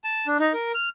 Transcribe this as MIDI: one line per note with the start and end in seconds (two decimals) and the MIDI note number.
0.04 0.27 81
0.27 0.38 62
0.40 0.53 63
0.53 0.72 70
0.74 0.89 89